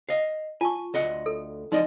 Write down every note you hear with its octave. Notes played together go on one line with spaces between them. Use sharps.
D#5 F5
F4 G#5 A5 C#6
D2 D#5 F#5
A4
F3 D#4 D5 D#5